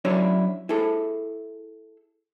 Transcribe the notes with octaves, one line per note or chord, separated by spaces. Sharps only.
F#3 C#4 D4 E4 C#5 D5
E4 G#4 A4